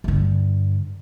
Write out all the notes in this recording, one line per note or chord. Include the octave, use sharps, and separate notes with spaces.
G2 D3